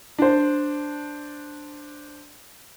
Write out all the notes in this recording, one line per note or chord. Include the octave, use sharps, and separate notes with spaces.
D4 C5